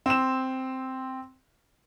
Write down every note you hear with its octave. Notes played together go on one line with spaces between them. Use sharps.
C4 E7